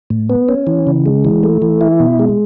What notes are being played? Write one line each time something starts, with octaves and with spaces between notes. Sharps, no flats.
A2
B3
C#4
E3
C#3
G#3
E3
A3
E3
E4
B2
G#3